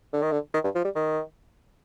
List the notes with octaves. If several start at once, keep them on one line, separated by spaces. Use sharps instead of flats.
D3
D#3
D3
D#3
G2
F3
G3
D#3